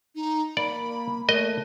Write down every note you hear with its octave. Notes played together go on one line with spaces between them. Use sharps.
D#4
A#3 D5 B5
A3 A#4 D#5